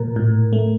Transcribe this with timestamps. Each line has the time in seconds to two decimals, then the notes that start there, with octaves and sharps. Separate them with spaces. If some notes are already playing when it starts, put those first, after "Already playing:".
Already playing: A#2 A#4
0.16 A2
0.53 A3